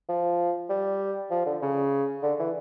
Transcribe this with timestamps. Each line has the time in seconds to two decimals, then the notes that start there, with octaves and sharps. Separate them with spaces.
0.09 F3
0.69 G3
1.31 F3
1.46 D3
1.62 C#3
2.23 D3
2.39 E3